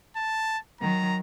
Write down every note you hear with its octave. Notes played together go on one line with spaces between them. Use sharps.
A5
D#3 F#3 A#5